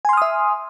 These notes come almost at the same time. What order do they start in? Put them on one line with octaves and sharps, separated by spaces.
G#5 C6 F6 D#6 E5